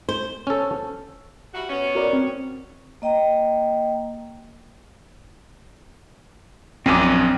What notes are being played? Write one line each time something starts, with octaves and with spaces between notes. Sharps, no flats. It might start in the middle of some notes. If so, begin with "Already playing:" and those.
C5
C#4 A4
G3 E4 F#4
B3 C#4
F#4 A#4 D5
C4
A#3 D#5 G5 A#5
A#1 F#2 C4 G#5 D6